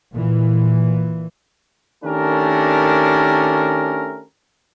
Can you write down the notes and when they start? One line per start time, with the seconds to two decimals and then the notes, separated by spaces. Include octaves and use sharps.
0.13 A#2 E3
2.04 D#3 A3 C#4 D4 G4 A#4